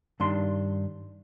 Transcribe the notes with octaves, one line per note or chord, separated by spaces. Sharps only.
G2 D#3 D4 C6